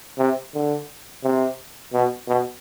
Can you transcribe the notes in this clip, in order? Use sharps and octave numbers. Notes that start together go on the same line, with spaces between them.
C3
D3
C3
B2
B2